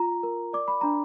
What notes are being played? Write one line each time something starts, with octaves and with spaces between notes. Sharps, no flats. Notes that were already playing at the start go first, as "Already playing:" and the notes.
Already playing: F4 A#5
A#4
D5 D6
B5
D4 A#5